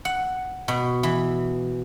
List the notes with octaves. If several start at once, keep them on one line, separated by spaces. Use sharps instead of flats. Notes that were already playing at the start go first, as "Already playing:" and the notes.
F#5
B2
E3